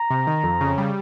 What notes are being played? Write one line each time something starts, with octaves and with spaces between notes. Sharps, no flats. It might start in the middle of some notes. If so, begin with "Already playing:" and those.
Already playing: A#5
C3
D#3
F2
C#3
G3